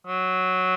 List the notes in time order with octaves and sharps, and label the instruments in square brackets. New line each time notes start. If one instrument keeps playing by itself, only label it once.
[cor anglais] F#3